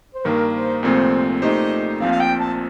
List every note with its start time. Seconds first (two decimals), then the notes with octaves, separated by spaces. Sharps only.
0.15 C5
0.25 G2 D#3 A#3 A#4
0.54 C5
0.83 C2 A#2 F3 A3 C4 C5
1.42 A#2 A3 D#4 G4 C5 D#5
2.00 A#1 A#2 F3 C4 F5
2.11 F5
2.20 G5
2.39 A5